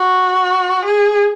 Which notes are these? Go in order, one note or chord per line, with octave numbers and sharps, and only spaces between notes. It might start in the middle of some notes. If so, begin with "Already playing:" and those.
Already playing: F#4
G#4